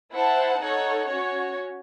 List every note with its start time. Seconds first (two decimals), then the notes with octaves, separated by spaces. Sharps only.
0.13 E4 C5 F#5 A5
0.62 D#4 A4 C#5 F#5
1.09 C#4 F#4 C#5